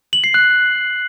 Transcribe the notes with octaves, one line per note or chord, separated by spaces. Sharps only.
F#7
C7
F#6